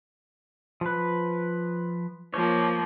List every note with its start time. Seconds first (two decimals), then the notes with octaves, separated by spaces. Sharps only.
0.81 F3 B4
2.34 F3 A#3 C#5